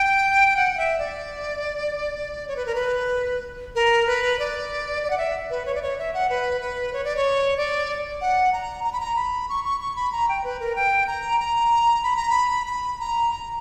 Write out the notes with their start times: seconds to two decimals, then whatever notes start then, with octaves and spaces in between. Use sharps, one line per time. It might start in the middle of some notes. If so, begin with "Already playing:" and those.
Already playing: G5
0.57 F#5
0.72 F#5
0.77 E5
0.99 D5
2.48 C#5
2.56 B4
2.66 A#4
2.75 B4
3.75 A#4
4.06 B4
4.39 D5
5.03 D5
5.10 F#5
5.18 E5
5.50 B4
5.66 C#5
5.75 D5
5.82 C#5
5.98 E5
6.14 F#5
6.30 B4
6.61 B4
6.93 C#5
7.04 D5
7.17 C#5
7.57 D5
8.21 F#5
8.53 A#5
8.84 A#5
8.93 B5
9.01 A#5
9.16 B5
9.49 C#6
9.65 C#6
9.80 C#6
9.96 B5
10.12 A#5
10.29 G5
10.44 B4
10.60 A#4
10.76 G5
11.07 A#5
11.40 A#5
12.03 B5
12.17 A#5
12.30 B5
12.67 B5
13.00 A#5
13.31 A#5